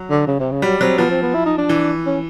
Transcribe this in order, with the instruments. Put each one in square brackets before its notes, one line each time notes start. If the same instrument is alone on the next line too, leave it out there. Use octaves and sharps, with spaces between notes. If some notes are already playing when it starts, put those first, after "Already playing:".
Already playing: [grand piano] F#3
[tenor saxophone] D3
C#3
C3
C#3
[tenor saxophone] F#3 [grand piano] G3
[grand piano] F#3 [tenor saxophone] C4
[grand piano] F3 [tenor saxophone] B3
[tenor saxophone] C4
B3
E4
D#4
D4
[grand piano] E3
[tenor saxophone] C#4